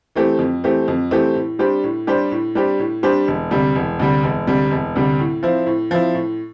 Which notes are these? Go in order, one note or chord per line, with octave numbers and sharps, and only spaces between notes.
E3 A3 C4 G4
F2
E3 A3 C4 G4
F2
E3 A3 C4 G4
A2
G3 D4 G4 C5
A2
G3 D4 G4 C5
A2
G3 D4 G4 C5
A2
G3 D4 G4 C5
E1
D2 C3 G3
E1
D2 C3 G3
E1
D2 C3 G3
E1
D2 C3 G3
A2
F3 C4 E4
A2
F3 C4 E4
A2